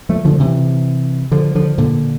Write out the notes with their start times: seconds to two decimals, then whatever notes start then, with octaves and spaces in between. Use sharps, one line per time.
0.09 F3 A3
0.25 D3 F3
0.40 C3 E3
1.32 D3 F3
1.55 D3 F3
1.78 A#2 D3